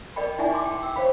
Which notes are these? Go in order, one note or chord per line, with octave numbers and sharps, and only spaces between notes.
A#4 D5 D#5 G5 B5
D#4 E4 D5 E5 G#5
C6 D6
G5
G5 E6
C5 C#5 F5 B5